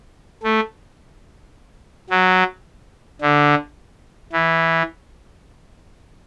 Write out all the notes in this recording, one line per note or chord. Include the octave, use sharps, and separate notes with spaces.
A3
F#3
D3
E3